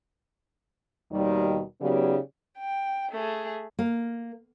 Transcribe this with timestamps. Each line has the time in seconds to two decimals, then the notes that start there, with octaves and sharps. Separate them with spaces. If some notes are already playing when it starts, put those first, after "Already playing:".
1.12 D#2 B2 D#3 G3
1.81 C#3 F#3 B3 D#4 G4 D5
2.58 G5
3.12 A3 G#4
3.79 A#3